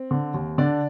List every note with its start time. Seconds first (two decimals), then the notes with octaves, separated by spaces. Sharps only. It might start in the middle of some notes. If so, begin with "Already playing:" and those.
Already playing: C4
0.11 D3
0.34 D#2
0.58 D3 D4 D5